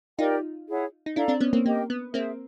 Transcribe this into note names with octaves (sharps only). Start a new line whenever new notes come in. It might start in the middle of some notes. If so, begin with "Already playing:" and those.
D#4 F4 G4 A#4 D5 G5
E4 G#4 C#5 F#5
D#4
D4 E4 A4 D5 F5 A#5
C4 D4
B3 C#4
A#3 C4
A#3 G4 A#4 D#5 G5
B3
A#3 C4 G#4 C5 E5